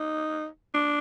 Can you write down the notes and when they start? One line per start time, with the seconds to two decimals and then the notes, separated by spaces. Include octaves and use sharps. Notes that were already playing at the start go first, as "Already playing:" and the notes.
Already playing: D#4
0.74 D4